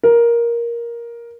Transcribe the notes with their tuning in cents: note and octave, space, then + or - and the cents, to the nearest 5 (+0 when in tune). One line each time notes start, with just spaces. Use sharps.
A#4 +10